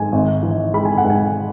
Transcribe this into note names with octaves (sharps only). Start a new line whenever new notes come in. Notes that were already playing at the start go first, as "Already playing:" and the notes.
Already playing: G#2 G#5
G#1
E3
G#3 B5
G#5
F#5
G#2
G#5